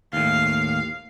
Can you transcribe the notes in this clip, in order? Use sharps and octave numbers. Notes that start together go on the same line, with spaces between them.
D#2 A2 F5